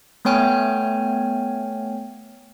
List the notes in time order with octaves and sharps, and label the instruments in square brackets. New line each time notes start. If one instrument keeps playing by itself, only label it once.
[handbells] A3 B3 C#5 G5 G#5 F6